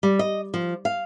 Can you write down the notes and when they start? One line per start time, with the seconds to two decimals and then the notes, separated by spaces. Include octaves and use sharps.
0.03 G3
0.19 D#5
0.54 F3
0.85 F5